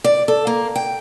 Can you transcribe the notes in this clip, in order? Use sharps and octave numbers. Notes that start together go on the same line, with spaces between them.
D5
A4
A#3
G5